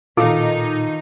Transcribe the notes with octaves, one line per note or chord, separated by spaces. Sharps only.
A#2 D#3 D#4 F4 A4 D6